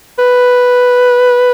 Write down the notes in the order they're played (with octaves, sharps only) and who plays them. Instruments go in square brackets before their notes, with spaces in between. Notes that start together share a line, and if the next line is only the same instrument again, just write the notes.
[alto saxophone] B4